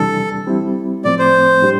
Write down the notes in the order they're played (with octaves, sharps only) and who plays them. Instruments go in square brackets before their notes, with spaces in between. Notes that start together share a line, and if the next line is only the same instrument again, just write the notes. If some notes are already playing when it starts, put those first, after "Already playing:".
Already playing: [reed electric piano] F2 C3 E3 G3 D4 [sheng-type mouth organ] A4
[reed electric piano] G3 C4 E4
[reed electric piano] A2 F3 A3 C4 [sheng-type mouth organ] D5
[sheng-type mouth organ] C5
[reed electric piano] A2 G3 D4 G4